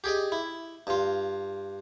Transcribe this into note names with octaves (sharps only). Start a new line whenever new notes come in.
G4 G#4 D5 D#5
E4
G2 F4